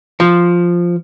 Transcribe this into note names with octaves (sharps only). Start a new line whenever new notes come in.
F3